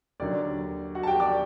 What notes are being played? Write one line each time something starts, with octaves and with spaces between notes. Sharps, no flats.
D#2 D3 F#3 D5
F#4 F#5
A5
G4 G5
D5 D6